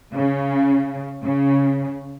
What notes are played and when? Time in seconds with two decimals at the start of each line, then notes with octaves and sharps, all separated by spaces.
0.14 C#3
1.24 C#3